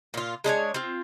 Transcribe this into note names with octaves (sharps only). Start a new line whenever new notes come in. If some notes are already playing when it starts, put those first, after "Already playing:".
A#2 F4
G#3 D4 C#5 G#5
C4 F4